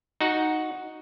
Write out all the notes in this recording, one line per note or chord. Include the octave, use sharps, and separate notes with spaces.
D#4 F#4 F#5